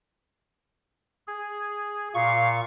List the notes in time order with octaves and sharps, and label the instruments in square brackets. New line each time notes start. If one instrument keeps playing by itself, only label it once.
[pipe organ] G#4
[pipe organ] A#2 C#6 [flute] F5